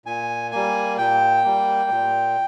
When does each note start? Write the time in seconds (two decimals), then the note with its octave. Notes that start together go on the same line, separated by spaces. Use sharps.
0.06 A#2 G#5
0.51 G3 A#3 G#5
0.98 A#2 G5
1.44 G3 A#3
1.90 A#2